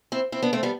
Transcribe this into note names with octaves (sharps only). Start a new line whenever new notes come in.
C4 E4
C4 E4
B3 D4
A3 C4
G3 B3